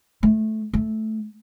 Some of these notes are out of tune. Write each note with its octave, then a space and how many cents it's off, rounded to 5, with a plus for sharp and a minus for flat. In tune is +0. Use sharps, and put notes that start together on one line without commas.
A3 -10
A3 -10